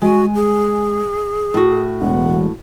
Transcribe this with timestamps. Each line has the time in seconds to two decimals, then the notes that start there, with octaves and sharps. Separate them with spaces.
0.02 G#3 F#4 G#5
0.35 G#4
1.54 A2 F#4
2.01 E1 F#5